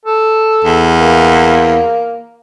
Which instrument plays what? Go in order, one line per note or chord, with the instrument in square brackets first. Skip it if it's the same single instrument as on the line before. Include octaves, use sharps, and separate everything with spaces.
[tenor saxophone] A4
[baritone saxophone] E2
[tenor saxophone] A#3